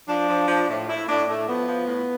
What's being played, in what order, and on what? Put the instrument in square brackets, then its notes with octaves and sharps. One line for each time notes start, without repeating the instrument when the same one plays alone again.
[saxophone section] F3 D4
F3
F3
A2
A2 E4
A2 D4
A2 A3
F3 B3
F3
A2